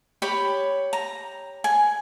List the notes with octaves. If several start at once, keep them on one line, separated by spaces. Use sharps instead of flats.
G4 C#5 B5
A#5
G#5